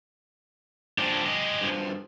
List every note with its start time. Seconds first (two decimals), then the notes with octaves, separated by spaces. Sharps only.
0.98 F3 G#3 D4 G4
1.26 D#5
1.61 G2 F3